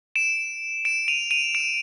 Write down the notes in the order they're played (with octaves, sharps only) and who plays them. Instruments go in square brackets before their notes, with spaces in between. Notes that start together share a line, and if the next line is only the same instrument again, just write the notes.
[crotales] D7 E7
D7 E7
D#7 F7
D#7 F7
D7 E7